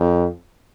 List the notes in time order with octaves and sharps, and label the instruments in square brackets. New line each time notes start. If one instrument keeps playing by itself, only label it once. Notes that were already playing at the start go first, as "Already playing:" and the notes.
Already playing: [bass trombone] F2